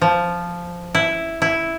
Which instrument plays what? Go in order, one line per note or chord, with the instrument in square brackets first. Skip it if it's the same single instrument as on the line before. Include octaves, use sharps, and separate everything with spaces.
[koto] F3
E4
E4